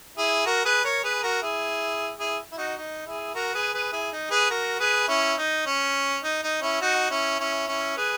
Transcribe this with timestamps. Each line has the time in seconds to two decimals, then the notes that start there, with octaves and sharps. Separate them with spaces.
0.17 E4 G#4
0.46 F#4 A#4
0.65 G#4 B4
0.84 A#4 C#5
1.04 G#4 B4
1.23 F#4 A#4
1.42 E4 G#4
2.20 E4 G#4
2.52 E4
2.57 D#4 F#4
2.77 D#4
3.06 E4 G#4
3.34 F#4 A#4
3.54 G#4 B4
3.74 G#4 B4
3.92 E4 G#4
4.13 D#4
4.31 G#4 B4
4.50 F#4 A#4
4.79 G#4 B4
5.08 C#4 E4
5.38 D#4
5.66 C#4
6.24 D#4
6.43 D#4
6.62 C#4 E4
6.81 D#4 F#4
7.10 C#4 E4
7.40 C#4 E4
7.68 C#4 E4
7.97 G#4 B4